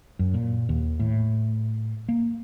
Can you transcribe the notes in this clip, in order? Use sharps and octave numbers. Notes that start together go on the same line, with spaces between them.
F#2
A#2
D#2
A2
A#3